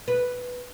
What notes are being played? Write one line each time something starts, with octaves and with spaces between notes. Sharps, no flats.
B4